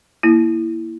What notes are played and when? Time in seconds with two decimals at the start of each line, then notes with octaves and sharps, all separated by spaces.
0.23 A#3 E4